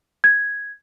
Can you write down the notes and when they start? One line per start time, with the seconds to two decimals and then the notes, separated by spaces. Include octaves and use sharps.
0.24 G#6